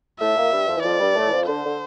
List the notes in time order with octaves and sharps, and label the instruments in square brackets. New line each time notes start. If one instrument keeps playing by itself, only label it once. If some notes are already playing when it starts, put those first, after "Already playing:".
[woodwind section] A2 A3 [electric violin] E5
[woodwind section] A#2 A#3
G2 G3
F2 F3
E3
[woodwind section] F2 F3 [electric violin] D5
[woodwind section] G2 G3
A2 A3
E3
F2 F3
[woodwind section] D3 [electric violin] C5
[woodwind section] D3